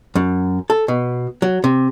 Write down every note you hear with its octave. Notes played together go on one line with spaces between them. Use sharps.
F#2
A4
B2
F#3
C3